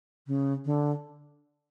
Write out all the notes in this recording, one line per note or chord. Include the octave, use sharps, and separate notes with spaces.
C#3
D3